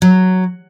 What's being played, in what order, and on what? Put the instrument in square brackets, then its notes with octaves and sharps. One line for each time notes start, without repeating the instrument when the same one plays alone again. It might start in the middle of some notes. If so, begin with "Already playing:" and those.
[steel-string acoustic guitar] F#3